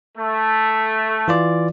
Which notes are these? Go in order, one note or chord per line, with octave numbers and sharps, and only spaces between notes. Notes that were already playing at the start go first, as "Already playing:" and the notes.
A3
E3 F4 D5